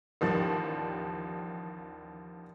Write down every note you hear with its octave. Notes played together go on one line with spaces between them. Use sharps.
A1 D#2 F3 G3 A6